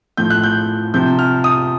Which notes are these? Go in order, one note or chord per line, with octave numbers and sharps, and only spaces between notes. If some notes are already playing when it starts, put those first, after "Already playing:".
A2 F3 G6
F#6
G6
C3 F3 G6
F6
D#6